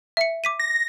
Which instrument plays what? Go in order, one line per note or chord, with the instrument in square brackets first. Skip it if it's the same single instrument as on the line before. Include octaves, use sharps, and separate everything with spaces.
[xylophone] E5 C#7
D6 B6 D#7
[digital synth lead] A#6